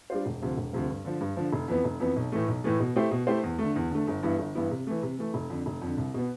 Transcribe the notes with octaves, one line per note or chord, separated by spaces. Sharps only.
G3 D4 F4 C5
E1
D2 C3 F3
E1
D2 C3 F3
G2
D3 F3
G2
D3 F3
F1
F2 E3 B3
F1
F2 E3 B3
B1
A2 E3 A3
B1
A2 E3 A3
B2
A3 E4 G4 C5
B2
A3 E4 G4 C5
E2
D3 A3
E2
D3 A3
G1
G2 E3 B3 E4
G1
G2 E3 B3 E4
C3
E3 A3
C3
E3 A3
F1
F2 D3
F1
F2 D3
C2
B2 B3